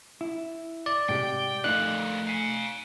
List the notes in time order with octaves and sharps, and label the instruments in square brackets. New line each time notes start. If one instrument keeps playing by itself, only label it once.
[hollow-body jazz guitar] E4
[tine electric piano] D5
[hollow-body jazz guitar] G#2 C3 G4 [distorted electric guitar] G5
[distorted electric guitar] F2 A#2 [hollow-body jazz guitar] A3 D#4 D5 [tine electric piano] F#6
[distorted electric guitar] F5 G#5